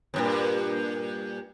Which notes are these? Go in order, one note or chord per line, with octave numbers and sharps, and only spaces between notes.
E2 G2 A#2